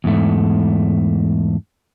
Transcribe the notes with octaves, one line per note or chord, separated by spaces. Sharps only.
E2 G#2 A3